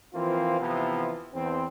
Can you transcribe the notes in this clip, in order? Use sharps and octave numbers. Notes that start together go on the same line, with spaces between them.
E3 F3 A#3 C4 F4
C3 E3 F3 B3
E2 C4